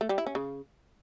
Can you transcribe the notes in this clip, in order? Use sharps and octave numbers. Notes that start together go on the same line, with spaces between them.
A3
G3
E4
C#4
C#3